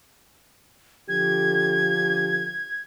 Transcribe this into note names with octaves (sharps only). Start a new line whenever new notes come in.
D3 F3 G4 G#6